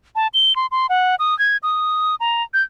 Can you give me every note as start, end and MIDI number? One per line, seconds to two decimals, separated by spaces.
0.16 0.27 81
0.34 0.56 103
0.56 0.67 84
0.71 0.87 84
0.89 1.15 78
1.19 1.37 87
1.39 1.57 92
1.63 2.15 87
2.20 2.43 82
2.54 2.63 91